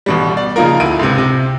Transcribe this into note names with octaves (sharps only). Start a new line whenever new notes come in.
A1 B2 G3
D5
C#3 F3 A#3 D#4 F4 A#4
D2 E4 D7 D#7
C#2 C3
C3